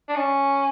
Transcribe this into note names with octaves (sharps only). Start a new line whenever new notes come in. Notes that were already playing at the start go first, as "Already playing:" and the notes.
D4
C#4